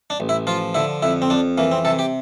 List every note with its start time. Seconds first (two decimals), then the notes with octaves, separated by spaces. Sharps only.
0.10 D4
0.20 A1
0.29 E4
0.47 F3 F4
0.75 D3 E4
1.02 F2 E4
1.22 C4
1.30 F2 D4
1.58 E3 A#3
1.72 C4
1.85 C3 A4
1.99 G4